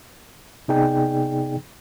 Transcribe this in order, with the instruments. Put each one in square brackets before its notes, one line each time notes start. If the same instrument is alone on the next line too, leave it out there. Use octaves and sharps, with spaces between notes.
[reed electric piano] C3 B3 D#4 G#4 D5 G5